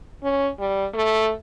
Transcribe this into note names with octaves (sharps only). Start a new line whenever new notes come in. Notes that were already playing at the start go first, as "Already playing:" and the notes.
C#4
G3
A3